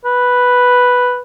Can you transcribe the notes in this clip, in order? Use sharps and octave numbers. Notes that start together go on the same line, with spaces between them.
B4